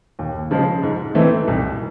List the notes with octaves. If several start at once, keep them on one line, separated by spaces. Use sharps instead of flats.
D#2
C#3 F3 G#3
G#2
E3 A3 C4 D#4
C2